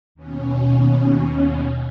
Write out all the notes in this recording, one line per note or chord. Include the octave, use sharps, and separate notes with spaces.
D#2 B2 C#4